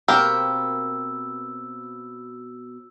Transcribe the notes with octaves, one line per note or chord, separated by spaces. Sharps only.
B2 A#3 C4 G4 A#4 E6